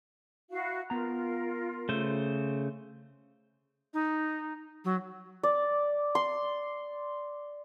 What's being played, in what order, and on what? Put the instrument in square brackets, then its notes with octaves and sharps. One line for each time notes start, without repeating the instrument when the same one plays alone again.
[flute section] E4 F#4 F5
[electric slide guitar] B3 A#5 [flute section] F4 A#4
[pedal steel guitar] C#3 C5 [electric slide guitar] A3
[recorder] D#4
F#3
[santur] D5
C6